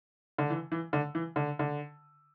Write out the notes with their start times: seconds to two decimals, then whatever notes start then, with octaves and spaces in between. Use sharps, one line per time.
0.38 D3
0.50 E3
0.72 E3
0.93 D3
1.15 E3
1.36 D3
1.59 D3